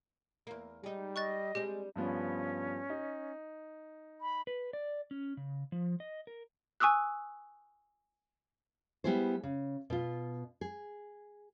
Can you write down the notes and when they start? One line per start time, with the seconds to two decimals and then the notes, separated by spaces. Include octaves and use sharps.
0.47 E2 A#3
0.84 G3 G#3 D#4
1.16 D#5 C#6 F#6 A6
1.55 G3 G#3 C4 D4 G4
1.96 G2 F3 B3 C#4
2.90 D#4
4.21 B5
4.47 B4
4.73 D5
5.11 C#4
5.37 C#3
5.72 F3
6.00 D#5
6.27 A#4
6.80 G#5 C#6 D#6 E6 F#6
9.04 G3 B3 E4 G#4 C5
9.43 C#3
9.90 B2 F4
10.61 G#4